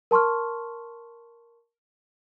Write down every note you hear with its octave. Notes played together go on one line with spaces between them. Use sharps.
A#4 A5 C6 C#6 F6